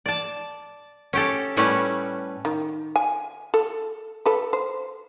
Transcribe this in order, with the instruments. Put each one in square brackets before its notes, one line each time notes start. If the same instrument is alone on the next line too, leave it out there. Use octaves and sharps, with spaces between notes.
[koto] D5 A5
C#4 G4 A4
A2 G3 A3 C#4 B4
[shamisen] D#3
G#5
A4
A4 B4
C5